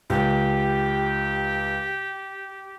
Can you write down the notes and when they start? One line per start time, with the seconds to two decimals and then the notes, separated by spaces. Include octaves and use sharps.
0.10 C#2 G4